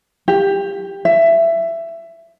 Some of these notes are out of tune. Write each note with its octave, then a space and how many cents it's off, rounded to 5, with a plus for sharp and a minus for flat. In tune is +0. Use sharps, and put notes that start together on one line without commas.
G4 +15
E5 +15